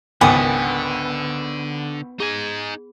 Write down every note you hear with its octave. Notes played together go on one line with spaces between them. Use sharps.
G#1 C#2 D3 B3 A#4 G5 G#5 D6
D#4 G#4 G#5